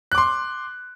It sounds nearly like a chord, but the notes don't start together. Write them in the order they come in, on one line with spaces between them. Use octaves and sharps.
F#6 D6 C6